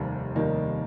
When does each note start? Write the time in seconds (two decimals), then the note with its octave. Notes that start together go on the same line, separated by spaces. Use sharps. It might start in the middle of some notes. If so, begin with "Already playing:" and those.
Already playing: F1 D#2 D#3 G3 C4
0.35 F1 D#2 D#3 G3 A#3 D#4